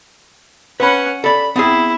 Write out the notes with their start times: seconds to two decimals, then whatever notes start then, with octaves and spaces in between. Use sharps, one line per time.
0.80 C#4 B4 F#5 B5
1.24 A4 D5 B5
1.56 B3 C4 E4 G#4